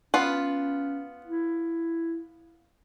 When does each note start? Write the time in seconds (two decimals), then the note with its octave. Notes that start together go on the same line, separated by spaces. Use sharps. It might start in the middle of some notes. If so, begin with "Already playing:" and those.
0.14 B3 C#4 F4 B4
1.26 E4